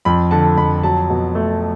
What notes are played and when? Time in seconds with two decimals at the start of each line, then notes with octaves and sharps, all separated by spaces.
0.05 F2 B5
0.31 D3 A5
0.57 F2 B5
0.83 F#3 A5
1.10 B2
1.35 A3